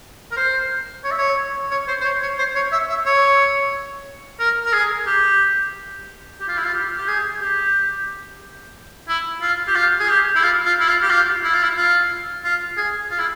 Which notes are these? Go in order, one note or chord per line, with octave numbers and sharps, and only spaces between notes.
A#4
C5
C#5
E5
C#5
C#5
C5
C5
C#5
C#5
C5
C#5
E5
E5
C#5
A#4
A#4
G#4
G4
G4
F4
E4
F4
G4
G4
G#4
G4
E4
F4
G4
F4
G#4
G4
E4
F4
F4
E4
F4
G4
F4
E4
F4
E4
F4
F4
G#4
F4
E4